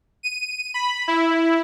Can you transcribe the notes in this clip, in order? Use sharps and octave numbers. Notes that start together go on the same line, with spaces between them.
D#7
B5
E4